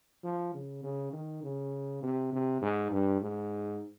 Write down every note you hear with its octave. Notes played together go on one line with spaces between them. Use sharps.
F3
C#3
C#3
D#3
C#3
C3
C3
G#2
G2
G#2